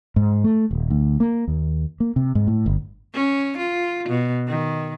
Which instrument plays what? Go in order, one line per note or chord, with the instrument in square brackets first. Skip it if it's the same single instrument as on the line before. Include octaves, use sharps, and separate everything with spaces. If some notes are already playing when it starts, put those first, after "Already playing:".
[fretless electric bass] G#2
A3
D#1
D2
A#3
D#2
A#3
C3
G#2
A2
G1
[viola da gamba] C#4
F4
B2
D#3